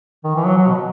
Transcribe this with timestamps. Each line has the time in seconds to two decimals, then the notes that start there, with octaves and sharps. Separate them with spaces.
0.24 D#3
0.36 E3
0.46 F#3
0.57 F#3
0.68 B2